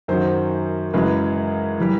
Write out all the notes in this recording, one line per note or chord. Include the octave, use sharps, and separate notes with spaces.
F#2 D#3 F#3 C5
F#2 C#3 E3 G#3 B4
E3 G3